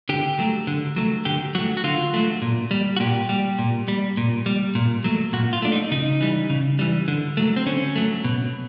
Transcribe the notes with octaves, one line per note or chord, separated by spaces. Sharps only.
D3 G4
F#3 A3
D3
F#3 A3
D3 G4
F#3 A3 F#4
F#4
D3 F4
F#3 A3
A#2
G3
F#4
A#2 G4
G3
A#2
G3
A#2
G3
A#2
F#3 A3
A#2 F#4
F4
F#3 A3 D4
D#4
C#3 D#4
E3 G3
C#3
E3 G3
D3
F#3 A3
C4
D3 C#4
F#3 A3
B2